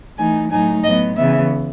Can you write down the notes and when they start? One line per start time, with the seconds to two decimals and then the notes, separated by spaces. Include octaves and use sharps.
0.18 E3 A3 D#4 G#5
0.51 A2 F#3 A3 D#4 G#5
0.84 A2 F#3 B3 D#5
1.16 C#3 E3 B3 E5